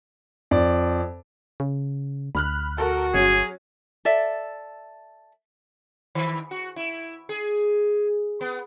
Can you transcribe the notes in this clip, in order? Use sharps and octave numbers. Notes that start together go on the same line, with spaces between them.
F2 D5
C#3
D2 B5 F6 F#6
F#4 A4 A#4
G1 F#3 C#4 G#4
A4 D5 E5
D#3
F#4
E4
G#4
B3